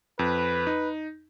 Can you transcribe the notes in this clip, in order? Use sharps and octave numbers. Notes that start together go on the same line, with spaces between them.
F2 B4
D#4